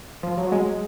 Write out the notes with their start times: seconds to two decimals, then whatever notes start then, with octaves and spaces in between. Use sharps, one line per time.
0.23 F3
0.38 F#3
0.52 G#3